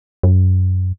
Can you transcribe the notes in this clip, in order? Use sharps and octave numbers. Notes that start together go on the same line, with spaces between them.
F#2